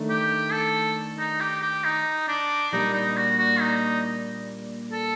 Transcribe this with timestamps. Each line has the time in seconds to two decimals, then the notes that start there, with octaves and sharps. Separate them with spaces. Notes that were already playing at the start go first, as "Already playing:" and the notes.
Already playing: D#3 A3 D4
0.09 G4
0.52 A4
1.19 D#4
1.40 G4
1.62 G4
1.84 D#4
2.28 D4
2.72 A#2 G3 A#3 D4 D#4
2.94 D#4
3.17 F#4
3.39 F#4
3.60 D#4
4.92 A4